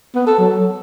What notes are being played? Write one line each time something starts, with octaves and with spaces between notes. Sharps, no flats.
B3
A4
F#3